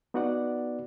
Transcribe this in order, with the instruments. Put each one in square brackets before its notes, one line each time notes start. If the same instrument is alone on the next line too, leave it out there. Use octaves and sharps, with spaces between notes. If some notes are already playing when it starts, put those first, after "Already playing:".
[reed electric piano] B3 D#4 F#4 B4 D5 F#5